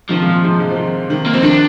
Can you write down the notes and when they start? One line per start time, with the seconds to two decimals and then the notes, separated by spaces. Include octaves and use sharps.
0.10 C3 D#3 F3
0.22 C3
0.26 A#2
0.44 G#2 C3
0.59 G#2 C3
0.70 F3
0.76 C3 D#3
1.10 C3 D#3
1.26 A#3
1.33 F3 C4
1.42 C3 D#3 D4